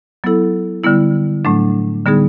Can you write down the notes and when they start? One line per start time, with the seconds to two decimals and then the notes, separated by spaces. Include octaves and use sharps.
0.24 F#3 B3 E4 A4
0.83 D3 G3 B3 E4
1.45 A2 F#3 A3 D4
2.06 D3 G3 B3 D#4 G#4